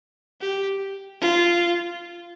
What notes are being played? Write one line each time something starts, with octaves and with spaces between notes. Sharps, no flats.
G4
F4